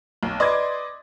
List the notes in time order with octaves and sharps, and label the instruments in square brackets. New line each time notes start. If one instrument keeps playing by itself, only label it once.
[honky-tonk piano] B1
[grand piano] B4 D5 D#5 [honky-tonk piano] C6 D6 G#6